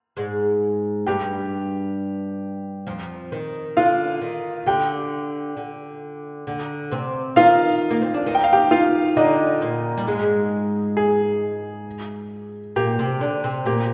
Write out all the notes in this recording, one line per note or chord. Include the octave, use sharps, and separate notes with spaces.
G#2 G#3
G2 G3 G4 G5
F2 F3
D#3
D3 F4 F5
D#3
D3 G4 G5
D3
D3
C3 C4
D#3 D#4 F4 F5
A#3
C4
D4
D#3 D#4
G5
F5
G4 G5
F4 F5
D3 D4 D#4 D#5
A#2 A#3
G3
G#2 G#3
G#4
A#2 A#3 G4
C3 C4
D3 D4
C3 C4
A#2 A#3 G4